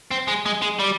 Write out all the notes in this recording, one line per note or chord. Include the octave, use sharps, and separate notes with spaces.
C4
G#3
G#3
G#3
G3